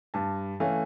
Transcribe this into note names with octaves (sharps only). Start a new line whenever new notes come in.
G2 A5
E3 A3 C#4 F5